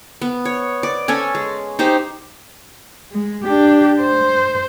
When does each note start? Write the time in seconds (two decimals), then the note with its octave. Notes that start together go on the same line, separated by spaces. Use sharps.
0.22 B3
0.45 C#5
0.83 D5
1.08 C#4 A4 G#5
1.35 G#3
1.79 D#4 G4 C5
3.12 G#3
3.44 D4 G4
4.00 C5